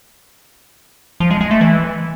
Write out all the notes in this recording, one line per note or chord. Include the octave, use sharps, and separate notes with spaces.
F3
G#3
G#3
A3
E3